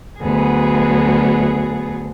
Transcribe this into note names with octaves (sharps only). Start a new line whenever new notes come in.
D2 F#3 B3 G#4